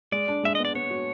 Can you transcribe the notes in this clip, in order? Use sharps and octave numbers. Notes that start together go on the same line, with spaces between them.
G#3 D5
D4
G#3 E5
B3 D#5
D5
B3 C#5
F#4